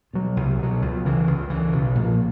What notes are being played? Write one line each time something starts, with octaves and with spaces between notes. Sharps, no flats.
B2 F#3
C2
B2 F#3
C#2
C#3 E3
C#2
C#3 E3
B1
A#2 F3 A#3